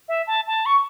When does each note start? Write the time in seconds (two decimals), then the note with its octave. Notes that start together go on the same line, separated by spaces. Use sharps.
0.08 E5
0.27 A5
0.47 A5
0.66 C#6